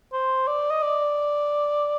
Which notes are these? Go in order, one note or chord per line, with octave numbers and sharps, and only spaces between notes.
C5
D5
D#5
D5